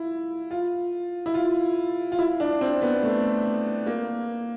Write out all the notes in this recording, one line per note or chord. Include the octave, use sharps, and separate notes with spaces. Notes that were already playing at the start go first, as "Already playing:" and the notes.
Already playing: E4 F4
F4
E4
F4
F4
E4
D4
C4
B3
A3
A#3